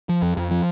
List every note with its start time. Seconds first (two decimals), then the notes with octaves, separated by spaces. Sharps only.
0.09 F3
0.22 F2
0.37 F2
0.51 F3